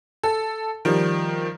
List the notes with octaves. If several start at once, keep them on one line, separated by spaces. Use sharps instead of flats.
A4
D#3 F3 G3